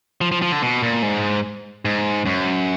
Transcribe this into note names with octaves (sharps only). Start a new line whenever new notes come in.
F3
F3
F3
D3
B2
A#2
G#2
G#2
F#2